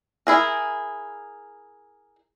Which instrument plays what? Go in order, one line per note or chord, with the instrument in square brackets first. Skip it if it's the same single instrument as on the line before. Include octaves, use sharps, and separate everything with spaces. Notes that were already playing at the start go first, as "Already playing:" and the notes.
[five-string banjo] E4 G#4 A#4